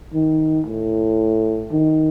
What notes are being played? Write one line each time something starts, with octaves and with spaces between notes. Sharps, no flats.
D#3
A2
D#3